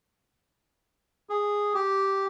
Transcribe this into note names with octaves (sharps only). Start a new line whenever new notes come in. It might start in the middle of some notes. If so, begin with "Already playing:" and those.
G#4
G4